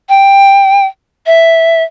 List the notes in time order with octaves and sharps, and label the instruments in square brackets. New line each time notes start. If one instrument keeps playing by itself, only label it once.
[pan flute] G5
E5